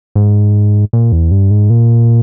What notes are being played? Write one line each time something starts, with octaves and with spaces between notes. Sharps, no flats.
G#2
A#2
E2
G2
G#2
A#2